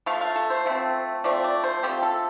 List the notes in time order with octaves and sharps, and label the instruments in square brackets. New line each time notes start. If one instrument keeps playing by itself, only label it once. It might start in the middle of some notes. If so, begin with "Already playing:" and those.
[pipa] F3 A3 F5
F5
A4
C5
F3 A3 C4
F3 A3 C4 D5
D5
C5
F3 A3 C4 G4
A4